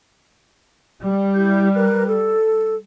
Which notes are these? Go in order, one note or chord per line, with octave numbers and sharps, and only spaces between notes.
G3
E4 G4 G6
A#4 B4 F#6
A4